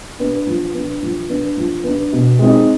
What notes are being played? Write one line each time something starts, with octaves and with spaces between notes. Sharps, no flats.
B3 D4
F3
B3 D4
F3
B3 D4
F3
B3 D4
B2
G#3 C4 D#4